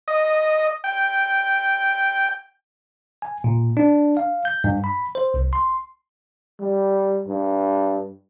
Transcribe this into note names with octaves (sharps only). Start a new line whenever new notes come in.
D#5
G5
G#5
A#2
D4
F5
G6
G2
B5
C5
C2
C6
G3
G2